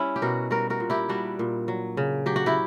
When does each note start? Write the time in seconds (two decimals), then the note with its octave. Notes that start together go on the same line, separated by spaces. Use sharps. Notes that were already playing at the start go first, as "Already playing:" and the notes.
Already playing: G3 C#4 E4
0.16 G4
0.22 B2 F#4 A#4
0.50 G3 F#4 A#4
0.70 F#4 A#4
0.80 A#2
0.90 E4 G4
1.09 G3 D4 F#4
1.39 A#2
1.68 F#3
1.97 C#3
2.26 F#3 G4
2.36 F#4
2.46 E4 G4